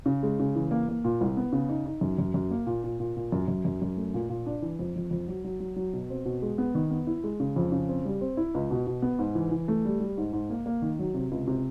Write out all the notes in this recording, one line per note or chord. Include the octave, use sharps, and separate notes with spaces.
C#3
G#3
C#3
E3
A#3
A#3
A#2
C2
B3
C#3
D#4
D#4
F#2
F#2
F#2
A#3
A#2
A#2
A#2
A#2
F#2
F#2
F#2
F#2
A3
A#2
A#2
D4
E3
F2
F2
F2
F#3
F#3
F#3
F#3
B2
C4
B2
G#3
B3
D#3
B3
E4
G#3
C#3
F2
C#3
C4
G3
C4
E4
C#2
B2
B2
B3
G#2
E3
E3
A3
G3
G3
G#2
G#2
A#3
A#3
D#3
F#3
C3
C#2
C3